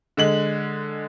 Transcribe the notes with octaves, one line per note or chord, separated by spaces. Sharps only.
D3 G#3 F#7